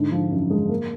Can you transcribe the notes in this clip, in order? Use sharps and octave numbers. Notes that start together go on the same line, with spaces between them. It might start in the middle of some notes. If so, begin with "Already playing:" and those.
Already playing: G#2 D3
F3
F#2
G#3
A#3